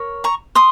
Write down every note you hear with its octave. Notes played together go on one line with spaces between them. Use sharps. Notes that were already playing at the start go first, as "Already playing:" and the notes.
Already playing: A#4 C#5
A#5 C#6
C6 D#6